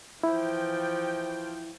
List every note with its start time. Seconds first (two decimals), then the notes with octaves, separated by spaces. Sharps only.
0.23 E3 F3 E4 G5